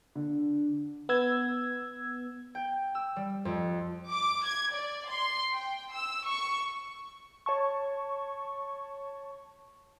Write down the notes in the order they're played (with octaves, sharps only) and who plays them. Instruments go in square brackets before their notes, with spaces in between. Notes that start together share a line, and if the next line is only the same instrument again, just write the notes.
[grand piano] D3
[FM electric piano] B3 E6 G#6
[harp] G5
E6
G3
F2
[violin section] D6
G#6
D5
C6
G5
E6
C#6
[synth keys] C#5 A5 C#6